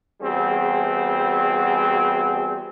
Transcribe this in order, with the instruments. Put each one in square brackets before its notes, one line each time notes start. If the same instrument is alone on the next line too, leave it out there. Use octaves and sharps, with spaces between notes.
[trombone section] E2 G3 C4 F#4 G#4